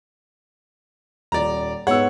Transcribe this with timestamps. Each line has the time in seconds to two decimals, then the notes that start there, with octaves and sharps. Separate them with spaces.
1.32 D#1 D5 A#5
1.87 G#2 B3 C#5 F#5 E6